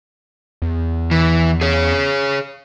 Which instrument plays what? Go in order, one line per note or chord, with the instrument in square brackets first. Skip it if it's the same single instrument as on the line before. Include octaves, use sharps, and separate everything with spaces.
[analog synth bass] E2
[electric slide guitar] E3
G#4 C#5